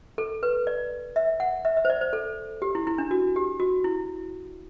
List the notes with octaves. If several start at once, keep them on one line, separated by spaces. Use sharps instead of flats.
A4
B4
D5
E5
F#5
E5
E5
C5
D5
C5
A4
G4
E4
E4
D4
F#4
G4
F#4
E4